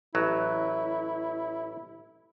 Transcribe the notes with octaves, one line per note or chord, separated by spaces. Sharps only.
A1 F#3 E4